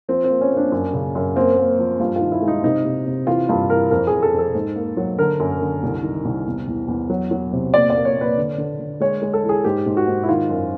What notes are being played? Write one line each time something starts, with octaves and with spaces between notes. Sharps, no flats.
F3 C4
C4
A#3
C#4
A#3
D4
F#2
C#3
F#2
A#3 C4
A#3
F3
G2 F4
D#3 F4
E4
G#3
D#4
C3 D#4
C3
C3
E3 F4
G2 F4
E3 A#4
F2 A#4
F2 G#4
A4
F2
A4
G#2
A#3
F#3
D3 A#4
F#2
D3
C2
D#3
C2
E2
E2
E2
F#3
F#3
C3
A#2 D5
D5
A#3
C#5
A#2
B4
D3
D3
D3
G#3 C#5
G#3
A4
E3
G#4
G#2 G4
G#2
F#4
G#2
E4
D#3 F4
F#2